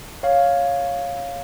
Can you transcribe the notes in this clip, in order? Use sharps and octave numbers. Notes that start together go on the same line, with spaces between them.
C#5 F5